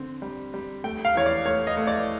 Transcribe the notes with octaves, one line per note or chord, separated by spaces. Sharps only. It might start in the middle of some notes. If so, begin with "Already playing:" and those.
Already playing: D3 C4
G3
G3
A3 G5
F5
E2 C#5
D5
A3 C#5
D#5
A3
D5